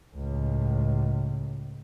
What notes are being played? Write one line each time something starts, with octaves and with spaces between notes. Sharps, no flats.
C#2 A2